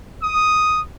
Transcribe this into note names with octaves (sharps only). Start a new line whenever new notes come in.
D#6